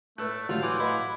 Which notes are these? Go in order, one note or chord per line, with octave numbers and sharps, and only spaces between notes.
A2 A3 B4 D5 E6 F#6
A2 F#3 G3 F4 F5 G6
E3 C6 D6 F#6
E4 B4 D#5 F#5